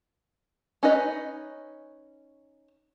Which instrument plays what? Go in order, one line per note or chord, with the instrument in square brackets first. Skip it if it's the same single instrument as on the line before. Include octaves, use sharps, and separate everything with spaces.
[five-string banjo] C#4 D#4 B4 D#5